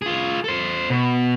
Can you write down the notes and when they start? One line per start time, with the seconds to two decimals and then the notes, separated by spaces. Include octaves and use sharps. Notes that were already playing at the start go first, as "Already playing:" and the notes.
0.02 F4 G#4
0.44 A4 C5
0.90 B2